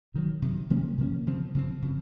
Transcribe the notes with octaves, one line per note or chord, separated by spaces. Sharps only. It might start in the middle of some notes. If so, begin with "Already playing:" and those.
C3 D#3 F#3
C3 D#3 F#3
C3 F3 A#3 C#4
C3 F3 A#3 C#4
C#3 F3 C4
C#3 F3 C4
C#3 F3